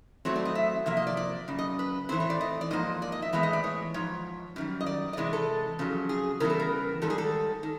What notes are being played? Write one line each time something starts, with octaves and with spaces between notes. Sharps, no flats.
A2 F#3 A3 C4 C#5
D5
D#5
E5
C3 F3 A#3 E5
D#5
D5
D5
F#2 C#3
D#5
B4
A2 E3 A3 C4 C5
C#5
D5
D#5
D5
G#2 F3 A#3 D#5
D5
D#5
E5
A2 E3 G#3 B3 E5
D#5
D5
C#5
G#2 F3 C#5
F#2 D#3 G3
D#5
D5
D#5
C3 E3 G#3 D5
A4
F2 C#3 F#3
G#4
C#3 E3 G3 B3 A#4
A4
A#4
G#2 D#3 G3 A4
G#4
A4
D#3